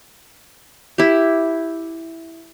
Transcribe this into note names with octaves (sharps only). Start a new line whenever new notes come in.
E4 G4